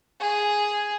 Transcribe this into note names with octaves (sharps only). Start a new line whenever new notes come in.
G#4